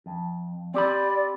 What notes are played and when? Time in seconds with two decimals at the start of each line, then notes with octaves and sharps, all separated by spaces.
0.06 F2
0.74 C4 G4 D5 B5